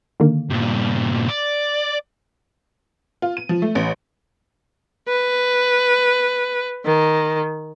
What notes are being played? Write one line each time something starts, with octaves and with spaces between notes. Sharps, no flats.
D3 D#3 A#3
G2 A#2
D5
F4
D#7
F3
A3
A1
B4
D#3